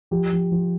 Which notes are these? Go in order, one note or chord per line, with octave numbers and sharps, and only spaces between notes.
F3 G4
F3
F3